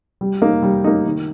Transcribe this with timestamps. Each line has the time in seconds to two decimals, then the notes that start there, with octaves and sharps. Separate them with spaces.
0.21 G3
0.42 A#3 D#4
0.63 G3
0.84 A#3 D#4
1.05 D#3